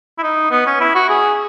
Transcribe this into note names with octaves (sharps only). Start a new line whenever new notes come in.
E4
D#4
B3
C#4
E4
F#4
G#4